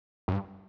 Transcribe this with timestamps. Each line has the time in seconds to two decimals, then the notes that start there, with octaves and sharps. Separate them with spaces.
0.28 F#2
0.33 G2